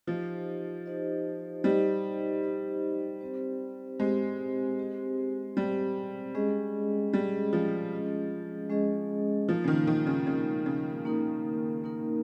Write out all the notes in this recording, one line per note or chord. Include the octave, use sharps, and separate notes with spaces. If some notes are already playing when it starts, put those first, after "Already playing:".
F3 D#4 G4 C5 D#5
D#4 G4 C5 D#5
G3 D#4 G4 C5 D#5
D#4 G4 C5 D#5
C4 G4 C5
G#3 C4 G4 C5
C4 G4 C5
G3 C4 G4 C5
G#3 C#4 G#4 D#5
G3 G#3 C#4 G#4 D#5
F3
G#3 C#4 G#4 D#5
G#3 C#4 G#4 D#5
F3 A#3 D#4 A#4
C#3
D#3
D#3
C#3
C#3 A#3 D#4 A#4
C#3
A#3 D#4 A#4
A#3 D#4 A#4